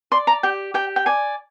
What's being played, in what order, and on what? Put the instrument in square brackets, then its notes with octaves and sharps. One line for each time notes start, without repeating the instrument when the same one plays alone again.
[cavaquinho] D5 C6
A#5
G4 G5
G4 G5
G5
D5 G#5